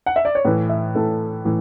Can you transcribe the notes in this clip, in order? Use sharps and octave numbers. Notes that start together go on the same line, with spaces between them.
F#5
E5
D5
C#5
A2 E3 B4
E5
A2 E3 A4
A2 E3